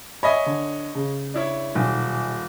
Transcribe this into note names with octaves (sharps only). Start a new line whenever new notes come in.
C#5 D#5 E5 G#5 B5
D3
C#3
D4 E4 C#5
D#1 B1